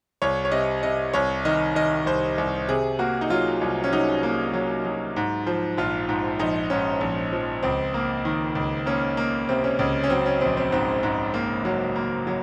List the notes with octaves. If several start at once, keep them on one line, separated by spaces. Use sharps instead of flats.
C2 C#5
C#5
C3 D#5
C3 D#5
C2 C#5
D#3 D#5
D#3 D#5
C2 C5
C2
C3 G#4
A#3 F#4
D#4
F#3 F4
C2
C#4
F#3 D#4
A#3
F#3
F#3
G#2
F3
A#1 F4
G#2
A#1 D#4
G#2 C#4
A#1
F3
C#2 C4
A#3
D#3
C#2
A#3 C#4
A#3
C3 C4
C#4
C#2 C#4
C#4
F#3 C4
C#4
A#1 C4
C4
G#2 C4
G#2
A#3
F#3
A#3
F#3